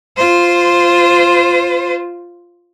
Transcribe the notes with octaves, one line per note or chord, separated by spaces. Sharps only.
F4 C5